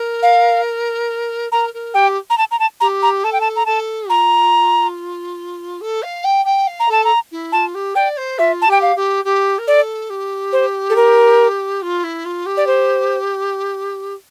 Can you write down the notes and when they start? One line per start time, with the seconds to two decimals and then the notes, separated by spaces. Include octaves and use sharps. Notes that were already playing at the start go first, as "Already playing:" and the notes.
Already playing: A#4
0.23 F5
1.52 A#4 A#5
1.74 A#4
1.94 G4 G5
2.30 A#5
2.38 A5
2.51 A#5
2.60 A5
2.80 G4 A#5
3.03 A#5
3.24 A4 A5
3.33 G5
3.41 A5
3.56 A#5
3.66 A4 A5
4.09 F4 A#5
5.81 A4
6.02 F5
6.24 G5
6.45 G5
6.67 F5
6.80 A#5
6.88 A4 A5
7.05 A#5
7.31 E4
7.52 F4 A5
7.74 G4
7.95 D5 G5
8.17 C5
8.38 F4 E5
8.62 A5
8.67 G4 G5
8.82 F5
8.96 G4
9.24 G4
9.58 A#4
9.67 A4 D5
10.10 G4
10.53 C5
10.90 A4
10.96 A#4
11.82 F4
12.03 E4
12.25 F4
12.46 G4
12.57 D5
12.67 C5